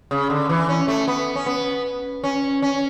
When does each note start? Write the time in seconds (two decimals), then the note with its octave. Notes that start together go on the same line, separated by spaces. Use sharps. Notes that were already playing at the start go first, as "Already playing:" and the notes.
0.11 C#3
0.30 D3
0.49 E3
0.69 C#4
0.88 A3
1.08 B3
1.36 C#4
1.46 B3
2.24 C#4
2.62 C#4